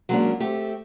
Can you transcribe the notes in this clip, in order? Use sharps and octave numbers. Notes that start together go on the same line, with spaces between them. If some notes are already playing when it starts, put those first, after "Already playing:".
F#3 G#3 A#3 B3 C#4 D4
A3 C4 G4